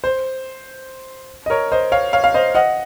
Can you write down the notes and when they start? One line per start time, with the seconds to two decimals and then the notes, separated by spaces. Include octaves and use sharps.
0.04 C5
1.46 D#5
1.50 A#4 C#5
1.72 C5 D#5
1.92 C#5 F5
2.13 C#5 F5
2.24 F5
2.34 C5 D#5
2.55 D#5 F#5